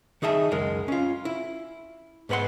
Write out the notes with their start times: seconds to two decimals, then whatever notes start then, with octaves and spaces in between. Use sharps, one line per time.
0.22 D#3 D#4 G#4 E5 F5 A5
0.51 C#2 F#2 G#3 A#4
0.88 C#4 F4
1.25 E4
2.29 G#2 B3 B4 F#5 C6